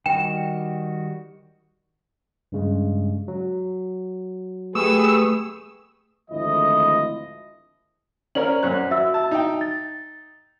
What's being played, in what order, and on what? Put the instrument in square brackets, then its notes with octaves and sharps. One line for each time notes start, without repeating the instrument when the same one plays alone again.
[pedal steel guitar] D#3 G3 F#4 [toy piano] G5 [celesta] E7
[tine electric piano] G2 C#3 G#3
F#3
[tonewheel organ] A3 C#6 D#6 [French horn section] G4 G#4 B4 [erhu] E6
[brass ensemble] G#1 D2 F3 E4 D#5
[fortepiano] C#4 A#4 [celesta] C5 D5 F#7
[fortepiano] F#2 C#5 F#6
[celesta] F#4 E5 E6
[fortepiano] A5
D#4 G5
[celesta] A6